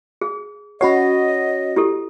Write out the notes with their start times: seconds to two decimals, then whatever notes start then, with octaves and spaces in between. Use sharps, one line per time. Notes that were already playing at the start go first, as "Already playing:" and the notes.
0.21 G#4
0.81 C#4 F#4 C#5 D#5 F#5 B5
1.76 E4 G4 A4